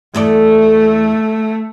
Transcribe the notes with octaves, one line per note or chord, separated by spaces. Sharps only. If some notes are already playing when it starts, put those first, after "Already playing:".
E2 A3 A4 D5